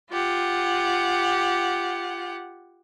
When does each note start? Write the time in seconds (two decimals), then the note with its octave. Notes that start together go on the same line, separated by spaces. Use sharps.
0.10 F4 G4 F#5